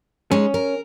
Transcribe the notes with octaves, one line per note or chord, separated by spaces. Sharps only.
G#3 C#4 D#4
A#4